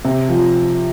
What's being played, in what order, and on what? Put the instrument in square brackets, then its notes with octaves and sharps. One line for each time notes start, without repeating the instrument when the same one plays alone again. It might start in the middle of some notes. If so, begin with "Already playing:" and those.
[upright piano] C3
F3